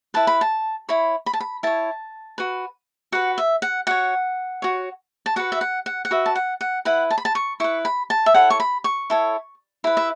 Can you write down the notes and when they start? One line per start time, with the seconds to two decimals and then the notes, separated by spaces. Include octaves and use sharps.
0.14 E4 B4 A5
0.27 B5
0.41 A5
0.89 E4 C#5 B5
1.26 B5
1.33 A5
1.40 B5
1.63 E4 C#5 A5
2.38 F#4 B4
3.12 F#4 B4 F#5
3.38 E5
3.62 F#5
3.87 F#4 C#5 F#5
4.62 F#4 C#5
5.26 A5
5.36 F#4 B4 F#5
5.52 E5
5.61 F#5
5.86 F#5
6.05 F#5
6.11 F#4 B4 E5
6.26 A5
6.35 F#5
6.61 F#5
6.85 E4 B4 F#5
7.11 A5
7.18 B5
7.25 A5
7.35 C#6
7.60 E4 B4 C#6
7.85 B5
8.10 A5
8.26 E5
8.34 E4 A4 C#5 F#5
8.50 C#6
8.60 B5
8.84 C#6
9.10 E4 A4 C#5
9.84 E4 B4 B5
9.97 E5